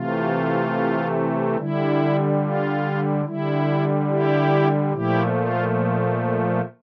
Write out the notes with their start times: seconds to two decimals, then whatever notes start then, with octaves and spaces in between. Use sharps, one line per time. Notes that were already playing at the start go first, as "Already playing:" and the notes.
Already playing: C3 E3 A3 F4
1.57 D3 G3 E4
2.41 F4
3.25 D3 G3 E4
4.09 E4 G4
4.93 A#2 F3 A3 E4 G4
5.35 F4